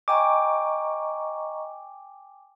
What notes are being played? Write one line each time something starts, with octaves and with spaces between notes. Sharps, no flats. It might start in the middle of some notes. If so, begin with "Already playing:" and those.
D#5 G5 G#5 A#5 C#6 D6